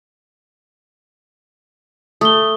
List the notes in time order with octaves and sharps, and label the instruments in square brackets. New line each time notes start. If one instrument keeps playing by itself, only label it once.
[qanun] A3 [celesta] D#6 G7